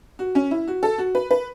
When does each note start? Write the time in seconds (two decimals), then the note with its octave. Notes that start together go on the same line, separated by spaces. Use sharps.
0.19 F#4
0.35 C#4
0.51 E4
0.68 F#4
0.83 A4
0.98 F#4
1.15 B4
1.31 B4